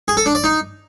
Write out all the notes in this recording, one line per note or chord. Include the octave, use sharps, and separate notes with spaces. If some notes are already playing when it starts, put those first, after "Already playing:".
G#4
A4
D4
D5
D#4